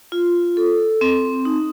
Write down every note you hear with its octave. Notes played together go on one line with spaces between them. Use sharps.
F4
A4
C4
D#4